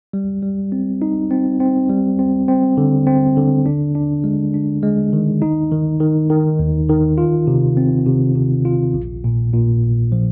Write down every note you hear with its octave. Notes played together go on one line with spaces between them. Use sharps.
G3
G3
C4
D#4
C4
C4
G3
C4
C4
D3
C4
D3
D4
D4
G#3
D4
G#3
D#3
D#4
D#3
D#3
D#3
D#2
D#3
F4
C3
C4
C3
C3
F4
A#1
A#2
A#2
A#1
F3